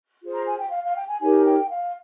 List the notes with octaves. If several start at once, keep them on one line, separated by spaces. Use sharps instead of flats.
F4 G#4 C5
A#5
G#5
G5
F5
F5
G5
G#5
D#4 G4 A#4 C#5 G#5
G5
F5